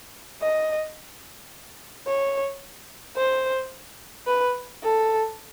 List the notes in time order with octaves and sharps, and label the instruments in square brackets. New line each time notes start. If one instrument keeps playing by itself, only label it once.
[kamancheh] D#5
C#5
C5
B4
A4